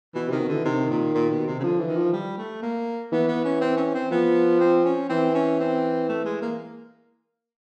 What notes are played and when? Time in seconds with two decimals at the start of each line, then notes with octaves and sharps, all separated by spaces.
0.15 B2 E3
0.28 C3 D#3
0.40 B2
0.48 D3 E3
0.64 C3 D#3
0.90 A#2
1.14 A#2
1.31 B2
1.47 C3
1.59 C#3
1.63 D3 F3
1.80 E3
1.88 D#3
1.97 F3
2.13 G3
2.38 A3
2.63 A#3
3.12 E3 B3
3.28 B3
3.45 C#4
3.61 C4
3.77 C#4
3.94 C4
4.11 F3 B3
4.60 C4
4.85 C#4
5.09 E3 C4
5.34 C#4
5.60 C4
6.09 A3
6.25 G#3
6.42 A#3